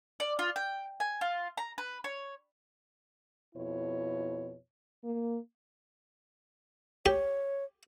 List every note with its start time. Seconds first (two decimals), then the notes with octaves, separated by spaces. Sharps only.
0.20 D5
0.39 F4
0.56 G5
1.00 G#5
1.21 F4
1.57 A#5
1.78 B4
2.04 C#5
3.55 F2 B2 E4 C#5
5.03 A#3
7.06 G4 C#5